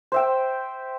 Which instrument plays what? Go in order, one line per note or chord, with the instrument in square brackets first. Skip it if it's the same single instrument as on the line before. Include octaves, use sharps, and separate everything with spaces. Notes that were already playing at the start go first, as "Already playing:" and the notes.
[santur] C5 E5 G5